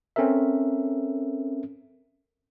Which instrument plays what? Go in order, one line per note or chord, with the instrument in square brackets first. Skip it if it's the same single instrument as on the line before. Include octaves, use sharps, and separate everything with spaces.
[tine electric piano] C4 C#4 A4 A#4 E5